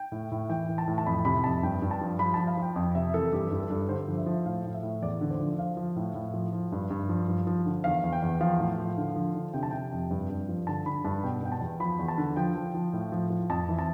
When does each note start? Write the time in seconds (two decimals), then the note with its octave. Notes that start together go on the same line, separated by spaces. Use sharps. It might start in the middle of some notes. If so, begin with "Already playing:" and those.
Already playing: G5
0.12 A2
0.32 A2
0.49 E3 G5
0.69 E3
0.78 A5
0.88 A2
0.98 A5
1.06 F2 B5
1.25 C3 B5
1.44 F2 A5
1.63 G2 G5
1.82 G2
1.91 A5
2.01 F3
2.19 F3 B5
2.34 F3 A5
2.47 F5
2.57 F3 G5
2.76 F2
2.95 C3 E5
3.14 E3 A4
3.32 G2 G4
3.51 G2
3.60 A4
3.70 G2
3.81 D5
3.88 D3 C5
4.08 F3
4.17 E5
4.26 F3
4.46 A2 F5
4.65 A2
4.74 E5
4.83 A2
5.02 E2 D5
5.21 D3
5.31 C5
5.40 F3
5.58 F3 F5
5.77 F3
5.96 A2
6.15 A2
6.34 F3
6.53 F3
6.72 G2
6.91 G2
7.09 F3
7.28 F3
7.47 F3
7.66 D3
7.84 E2 F5
8.04 E2
8.13 G5
8.22 E2
8.41 F3 F5
8.59 A2
8.78 F3
8.98 D3
9.16 F3
9.35 D3
9.54 C3 G5
9.63 A5
9.71 C3 G5
9.92 F2
10.11 G2
10.30 G2
10.48 F3
10.67 D3 A5
10.86 D3 B5
11.05 G2 A5
11.24 B2 G5
11.42 B2 G5
11.52 A5
11.61 E2
11.80 F3 B5
11.99 E2
12.08 A5
12.18 D3
12.36 F3 G5
12.55 F3
12.74 F3
12.93 A2
13.12 F3
13.30 F3
13.50 F2 A5
13.69 E3
13.79 A5